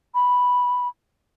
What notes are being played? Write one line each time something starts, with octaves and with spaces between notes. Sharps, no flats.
B5